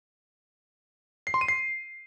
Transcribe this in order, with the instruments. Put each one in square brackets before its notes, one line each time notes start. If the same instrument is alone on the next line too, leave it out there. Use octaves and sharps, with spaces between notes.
[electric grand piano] C7
C6
D#7
C7